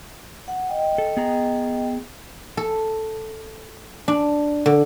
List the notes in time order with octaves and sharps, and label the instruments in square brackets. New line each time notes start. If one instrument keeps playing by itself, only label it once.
[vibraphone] F#5
D#5 G5
[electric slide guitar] A4
B3 G#4 A#5
[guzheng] A4
D4
D3